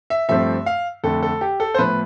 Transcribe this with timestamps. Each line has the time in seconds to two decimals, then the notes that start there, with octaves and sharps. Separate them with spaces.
0.10 E5
0.29 G2 F3 A3 C4 E5
0.66 F5
1.04 F2 D3 A3 A4
1.23 A4
1.41 G4
1.60 A4
1.74 C5
1.79 A2 F3 B3 B4